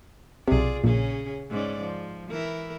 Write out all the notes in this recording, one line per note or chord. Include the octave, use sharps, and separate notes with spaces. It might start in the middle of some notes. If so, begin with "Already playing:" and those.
B1 C3 F4 G#4 D5
A#1 A#2 C#3 C#4 G#4
G#2 C#4 D5
F3
E3 E4 A#4